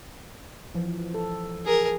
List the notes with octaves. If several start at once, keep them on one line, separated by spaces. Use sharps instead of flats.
E3 F3
A4
G#4 A#4